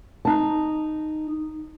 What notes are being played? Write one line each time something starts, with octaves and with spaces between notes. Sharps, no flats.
D#4 A5